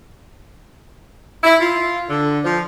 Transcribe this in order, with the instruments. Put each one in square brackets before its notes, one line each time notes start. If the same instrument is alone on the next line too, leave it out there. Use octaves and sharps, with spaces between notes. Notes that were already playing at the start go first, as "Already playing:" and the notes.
[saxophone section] E4
F4
D3
F3